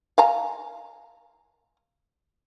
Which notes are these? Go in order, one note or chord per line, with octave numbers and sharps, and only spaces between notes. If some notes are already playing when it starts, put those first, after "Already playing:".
F5 G#5 A#5